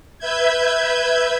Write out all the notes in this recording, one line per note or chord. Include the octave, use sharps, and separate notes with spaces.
B4 E5 G6 G#6